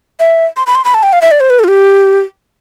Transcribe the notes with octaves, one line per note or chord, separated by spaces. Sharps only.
E5
C6
B5
C6
B5
A5
G5
F5
E5
D5
C5
B4
A4
F4
G4